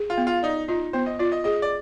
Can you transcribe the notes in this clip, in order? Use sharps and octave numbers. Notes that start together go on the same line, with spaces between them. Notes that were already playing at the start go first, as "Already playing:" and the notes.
Already playing: G#4
F4
B3
F4
D#4 D5
D#4 F4
B3 C5
D#5
F4 D5
D#5
G#4 D#5
D5